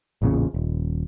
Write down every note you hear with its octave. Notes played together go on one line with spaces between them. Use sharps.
A1 E2 A#2 C#3
D#1